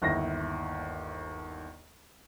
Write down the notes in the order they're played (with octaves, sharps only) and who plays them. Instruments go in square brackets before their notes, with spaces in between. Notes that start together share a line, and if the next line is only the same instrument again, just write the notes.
[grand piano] G1 D#2 E4 A#6